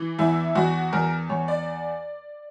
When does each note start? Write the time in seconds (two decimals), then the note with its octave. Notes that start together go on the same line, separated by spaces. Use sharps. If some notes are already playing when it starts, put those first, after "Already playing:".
Already playing: E3
0.19 E2 E4
0.55 E2 F#4
0.93 E2 A#4
1.30 E2 C#5
1.48 D5